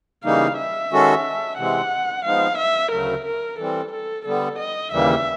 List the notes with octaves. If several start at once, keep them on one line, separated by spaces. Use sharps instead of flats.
C#3 E3 G3 A#3 D#4 F5
E5
D#3 G#3 C#4 F#4 A4
C3 E3 G#3 C4 F#5
F3 G#3 B3 D#4 F5
E5
D2 C#3 F#3 A3 A#4
A#4
E3 G3 C4 A4
A4
D3 G3 B3 A4
D#5
D#2 C#3 E3 G3 A#3 E5